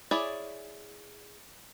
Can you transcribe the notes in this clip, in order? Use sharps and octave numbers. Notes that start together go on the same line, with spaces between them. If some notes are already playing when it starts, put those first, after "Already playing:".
E4 G#4 C#5 D5